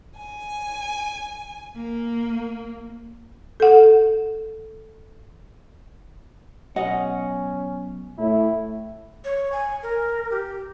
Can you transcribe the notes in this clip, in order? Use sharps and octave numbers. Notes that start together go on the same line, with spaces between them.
G#5
A#3
A4 F#5
B1 C#4 D#5 F#5
A2 E4
C#5
G#5
A#4
G4